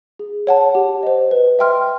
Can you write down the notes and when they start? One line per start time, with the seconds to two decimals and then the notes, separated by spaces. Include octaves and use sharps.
0.19 G#4
0.47 C#5 F#5 A5
0.75 G4
1.03 C5 D#5
1.31 B4
1.59 E5 G5 C6 F6